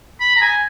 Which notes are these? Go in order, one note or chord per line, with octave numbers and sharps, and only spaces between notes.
B5
A#5
G#5